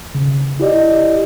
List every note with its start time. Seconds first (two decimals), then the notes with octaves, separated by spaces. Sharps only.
0.15 C#3
0.60 E4 G4 D5 D#5